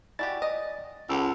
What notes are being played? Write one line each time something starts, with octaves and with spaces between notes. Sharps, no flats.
E4 F#4 G4 D5 G#5 A6
D#5
C#2 A4 F#5 A5 E6